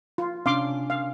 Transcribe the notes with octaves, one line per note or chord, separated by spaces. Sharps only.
F4
C3 C#4 D4 F5 C6 D6
F5